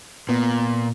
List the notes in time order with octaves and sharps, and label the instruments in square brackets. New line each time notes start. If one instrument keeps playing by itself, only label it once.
[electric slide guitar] A#2 [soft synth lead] B3